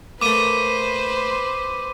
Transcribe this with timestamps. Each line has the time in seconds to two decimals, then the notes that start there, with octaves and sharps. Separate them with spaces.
0.21 A3 A#3 B4 C5 D6 D#7